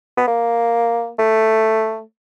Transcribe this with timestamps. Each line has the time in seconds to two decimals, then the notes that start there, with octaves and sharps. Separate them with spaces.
0.18 B3
0.28 A#3
1.19 A3